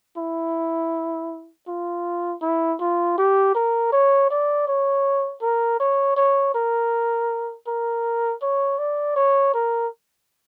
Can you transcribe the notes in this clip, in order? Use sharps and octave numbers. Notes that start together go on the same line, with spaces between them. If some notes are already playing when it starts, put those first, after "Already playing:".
E4
F4
E4
F4
G4
A#4
C#5
D5
C#5
A#4
C#5
C#5
A#4
A#4
C#5
D5
C#5
A#4